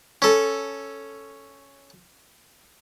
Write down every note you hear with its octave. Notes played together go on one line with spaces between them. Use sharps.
C#4 A4